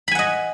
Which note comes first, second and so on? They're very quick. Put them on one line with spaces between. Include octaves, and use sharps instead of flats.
B5 G#5 F#5 D#5